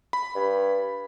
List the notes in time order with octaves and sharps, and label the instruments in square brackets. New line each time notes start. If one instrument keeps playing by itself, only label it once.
[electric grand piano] B5
[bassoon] G2